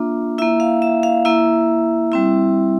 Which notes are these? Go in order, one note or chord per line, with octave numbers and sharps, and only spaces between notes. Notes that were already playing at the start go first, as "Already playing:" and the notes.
Already playing: A#3 D4 F4 E5
A#3 E4 E5
F5
E5
F5
A#3 E4 E5
G3 C4 E4